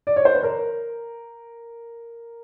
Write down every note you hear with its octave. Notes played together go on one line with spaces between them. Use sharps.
D5
C#5
C5
B4
A#4